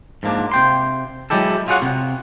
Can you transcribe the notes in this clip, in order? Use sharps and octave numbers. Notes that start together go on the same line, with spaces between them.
G#2 F3 A#3 D4
C3 G5 C6
F#3 G#3 E4 G4 A4
F4 G#4 C#5 F#5
C3